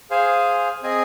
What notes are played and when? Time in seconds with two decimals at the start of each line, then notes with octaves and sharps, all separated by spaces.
0.10 G#4 C5 F5 G#5
0.82 C4 G#4 D#5 G#5